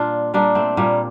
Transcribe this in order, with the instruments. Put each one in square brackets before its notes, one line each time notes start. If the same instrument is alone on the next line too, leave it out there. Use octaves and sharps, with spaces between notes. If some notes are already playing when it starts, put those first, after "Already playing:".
Already playing: [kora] A#2 G3 D4 F4
G3 A#3 D4
A3 C4
A#2 G3 A#3